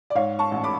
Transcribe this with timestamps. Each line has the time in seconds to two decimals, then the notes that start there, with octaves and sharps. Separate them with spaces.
0.10 D5
0.15 G#2 C#5 F5
0.39 A5 C#6
0.51 A1
0.63 B5 D6